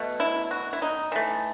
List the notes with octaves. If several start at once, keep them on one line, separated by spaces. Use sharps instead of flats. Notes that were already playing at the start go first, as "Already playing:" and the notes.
Already playing: B2 A3
E4
F#4
E4
D#4
E3 A3